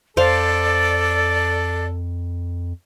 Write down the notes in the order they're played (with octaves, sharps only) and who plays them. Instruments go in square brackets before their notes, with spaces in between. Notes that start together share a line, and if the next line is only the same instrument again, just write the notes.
[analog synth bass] F2 [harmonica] A4 [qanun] C5 F5 [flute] D5